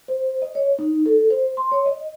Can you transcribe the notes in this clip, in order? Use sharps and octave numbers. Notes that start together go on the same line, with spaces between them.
C5
D#5
C#5
D#4
A4
C5
C6
C#5
D#5